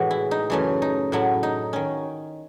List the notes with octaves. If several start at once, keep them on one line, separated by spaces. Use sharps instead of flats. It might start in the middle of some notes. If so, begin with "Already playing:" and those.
Already playing: A2 C3 E3 G#3 F#4
E4
D#4
F#2 C#3 E3 A3 C#4
D#4
A2 F#3 A3 E4
D#4
D#3 C#4